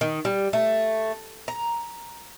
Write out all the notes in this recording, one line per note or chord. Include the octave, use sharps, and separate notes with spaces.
D#3
G3
A3
A#5